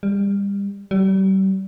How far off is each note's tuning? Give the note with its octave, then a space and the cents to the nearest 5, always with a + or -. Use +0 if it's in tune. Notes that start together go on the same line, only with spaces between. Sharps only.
G3 +30
G3 -35